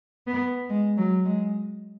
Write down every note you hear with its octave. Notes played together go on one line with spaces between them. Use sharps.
B3
G#3
F#3
G#3